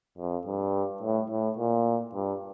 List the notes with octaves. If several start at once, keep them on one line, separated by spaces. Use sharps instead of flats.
F2
G2
A2
A2
A#2
G2